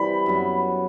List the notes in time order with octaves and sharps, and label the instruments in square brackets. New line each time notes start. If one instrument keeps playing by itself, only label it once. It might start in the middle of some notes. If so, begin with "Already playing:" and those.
Already playing: [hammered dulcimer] C3 E3 G3 C4 [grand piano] B5
[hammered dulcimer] F#2 F#3 B3